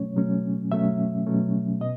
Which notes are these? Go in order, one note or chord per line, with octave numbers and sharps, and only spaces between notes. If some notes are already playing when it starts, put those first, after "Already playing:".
Already playing: B2 F#3 A3 C#4 C#5
B2 F#3 A3 C#4
B2 F#3 A3 C#4 E5
B2 F#3 A3 C#4
B2 D#5